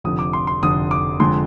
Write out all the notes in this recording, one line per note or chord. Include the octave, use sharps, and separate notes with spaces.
F1 F2 D3 D#6
D6
C6
C6
F1 F2 D3 D#6
D6
F1 F2 D3 G#3 C6